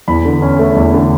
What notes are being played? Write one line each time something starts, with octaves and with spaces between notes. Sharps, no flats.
E2 B5
D3
C#4
A3
E2
D3